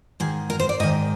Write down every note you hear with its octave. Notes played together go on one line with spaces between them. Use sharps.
G#2 D#3 G#4
A#4
C5
D5
G#2 D#3 D#5